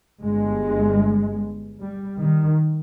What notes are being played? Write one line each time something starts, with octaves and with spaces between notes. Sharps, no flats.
G1 G2 G#3
G3
D#3